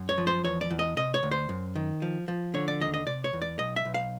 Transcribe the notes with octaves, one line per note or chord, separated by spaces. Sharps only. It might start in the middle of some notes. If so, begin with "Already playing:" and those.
Already playing: F#2
C#5
F3
C5
E2 C#5
D5
E2
D#5
C3 D#5
C#5
D2
C5
F#2
D#3
F3
F3
D3 C#5
D5
D#2 D#5
D#5
C3 D5
C#5
E2
D5
B1 D#5
E5
B1
F5